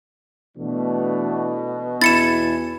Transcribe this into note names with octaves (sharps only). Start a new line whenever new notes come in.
B2 E3 A3 D4
E2 E4 A6 C#7 E7